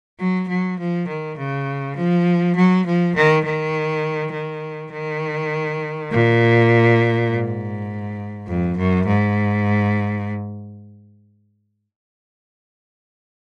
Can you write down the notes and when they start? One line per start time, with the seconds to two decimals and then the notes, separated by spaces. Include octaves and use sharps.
0.20 F#3
0.48 F#3
0.79 F3
1.08 D#3
1.38 C#3
1.97 F3
2.56 F#3
2.86 F3
3.16 D#3
3.45 D#3
4.33 D#3
4.92 D#3
6.12 A#2
7.30 G#2
8.47 F2
8.78 F#2
9.07 G#2